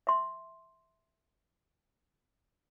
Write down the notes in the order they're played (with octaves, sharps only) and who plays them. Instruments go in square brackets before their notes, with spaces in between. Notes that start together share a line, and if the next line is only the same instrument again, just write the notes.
[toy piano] E5 C6